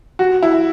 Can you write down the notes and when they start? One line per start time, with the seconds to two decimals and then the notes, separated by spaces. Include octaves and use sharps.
0.19 F#4
0.43 E4